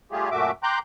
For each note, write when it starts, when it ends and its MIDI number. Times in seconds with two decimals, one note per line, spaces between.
0.12 0.29 55
0.12 0.29 57
0.12 0.29 65
0.12 0.29 67
0.12 0.29 68
0.31 0.51 42
0.31 0.51 46
0.31 0.51 57
0.31 0.51 66
0.31 0.51 76
0.31 0.51 86
0.63 0.79 79
0.63 0.79 82
0.63 0.79 84
0.63 0.79 86
0.63 0.79 90
0.63 0.79 91